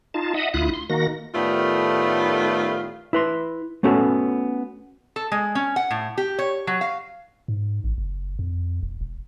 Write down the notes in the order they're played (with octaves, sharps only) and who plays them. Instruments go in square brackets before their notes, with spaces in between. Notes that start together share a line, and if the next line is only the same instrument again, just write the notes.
[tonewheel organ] D#4 F4 A5
D#5 E5 F#5 D#6
D2 E4 F4 D#6 F#6
C6
D#3 A#3 F#4 A#6
[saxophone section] A2 D#3 G3 A3 B3 F4
[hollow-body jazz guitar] E4 B4 C6
A3 B3 C#4 F#4 A4
[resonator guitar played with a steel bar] A4
G#3
C#4
F#5
A2
G4
C#5
F#3
F5
[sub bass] G#2
A1
F#1
F2
E1
E1